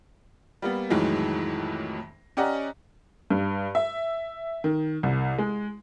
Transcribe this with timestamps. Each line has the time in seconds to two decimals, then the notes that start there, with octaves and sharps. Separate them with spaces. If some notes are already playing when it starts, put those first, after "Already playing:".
0.62 G3 A#3 B3
0.90 F2 A2 D#3 E3 F#3 G#3
2.37 C#4 G4 D5 D#5 F#5 A#5
3.30 G2
3.75 E5
4.64 D#3
5.03 C2
5.38 G#3